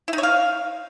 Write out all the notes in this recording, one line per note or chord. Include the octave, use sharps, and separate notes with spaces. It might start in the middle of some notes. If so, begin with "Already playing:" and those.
E4
D#4
C#5
F5